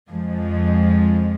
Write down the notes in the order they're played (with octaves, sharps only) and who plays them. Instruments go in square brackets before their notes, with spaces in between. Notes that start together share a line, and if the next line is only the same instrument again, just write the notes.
[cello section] F2 F3 G#3